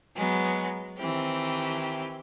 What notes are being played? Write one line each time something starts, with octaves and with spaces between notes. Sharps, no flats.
F#3 G#3 B3
D#3 E3 C4 G4